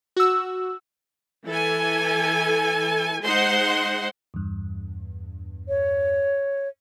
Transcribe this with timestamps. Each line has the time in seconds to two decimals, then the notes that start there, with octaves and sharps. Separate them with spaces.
0.16 F#4 E6
1.46 E3 A4 G#5
3.24 G#3 D#4 C5 F#5 C6
4.34 E2 G2
5.68 C#5